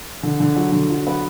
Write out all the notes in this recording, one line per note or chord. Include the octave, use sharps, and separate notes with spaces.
D3
D3
F#3
D3
F#3
B3